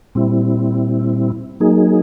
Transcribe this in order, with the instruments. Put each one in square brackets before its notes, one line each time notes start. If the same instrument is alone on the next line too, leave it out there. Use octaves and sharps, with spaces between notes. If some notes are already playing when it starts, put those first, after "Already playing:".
[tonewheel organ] A#2 G3 C4 E4
F#3 A#3 D#4 G#4